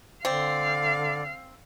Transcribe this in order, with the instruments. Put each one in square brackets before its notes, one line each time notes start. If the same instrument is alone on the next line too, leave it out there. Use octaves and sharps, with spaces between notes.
[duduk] D3 [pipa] C4 [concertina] D5 [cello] F5